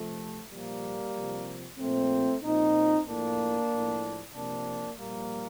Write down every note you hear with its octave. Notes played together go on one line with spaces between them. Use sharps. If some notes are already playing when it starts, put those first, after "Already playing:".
Already playing: C3 F3 A3
A#2 F3 G3 A#3
C3 F3
A#2 F3 A3 C4
A#2 F3 C4 D#4
A2 F3 A#3 D4
A2 F3
C3 F3 A#3 D4
A#2 F3 G3 A#3